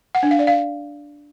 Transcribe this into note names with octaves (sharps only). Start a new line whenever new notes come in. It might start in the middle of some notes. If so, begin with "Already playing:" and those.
F#5
D4
F5
D5
F5